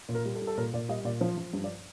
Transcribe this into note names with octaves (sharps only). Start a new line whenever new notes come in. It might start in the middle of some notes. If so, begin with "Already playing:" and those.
A#2
A#4
G3
A4
G3
A4
A#2 A#4
A#2 D5
G3 D#5
A#2 D5
F3 C5
F3
G2
D5